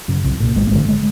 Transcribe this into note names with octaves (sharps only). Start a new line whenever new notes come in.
F#2 C#3
C2
A#2
G#1 G#3
A#3
G2
D3 A3
G#3